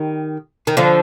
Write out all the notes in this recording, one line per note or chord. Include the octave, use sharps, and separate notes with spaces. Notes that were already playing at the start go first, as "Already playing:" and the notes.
Already playing: D#3 G3
D#3
D3 F3